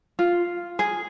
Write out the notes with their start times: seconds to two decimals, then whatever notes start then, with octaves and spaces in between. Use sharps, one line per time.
0.19 F4
0.79 G#4